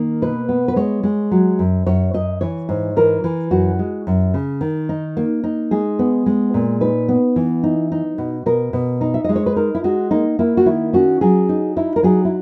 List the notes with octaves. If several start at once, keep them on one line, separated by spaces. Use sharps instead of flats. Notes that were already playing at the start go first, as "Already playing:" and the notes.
Already playing: D#3 A#3
B2 B4
B3
B4
G#3 C#5
G#3
F#3
F#2
F#2 C#5
F#2 D#5
E3 C#5
G#2
E3 A#4
E3
F#2 F#4
G#3
F#2
C#3
D#3
D#4
A#3
D#4
G#3 G#4
B3
G#3
A#2
D#4 B4
B3
E3
D#4
D#4
B2
B2 A#4
B2
D#4
E5
G#3 D#5
C#5
B4
D#4 A#4
E4
G#3 F#4
A#3 D#4
A#3 E4
F#4
D#3 E4
C#4 F#4
F#3 G#4
D#4
D#4 E4
A#4
F#3 G#4
E4